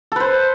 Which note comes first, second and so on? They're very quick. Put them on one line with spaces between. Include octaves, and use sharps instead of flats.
A4 B4 C5